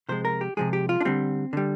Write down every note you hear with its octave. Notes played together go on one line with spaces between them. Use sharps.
C3 F3 G#3 C5
A#4
G4
C3 F3 G#3 G#4
G4
F4
D4
D3 G3 C4
D3 G3